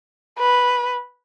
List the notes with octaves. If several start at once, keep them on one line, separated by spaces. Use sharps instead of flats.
B4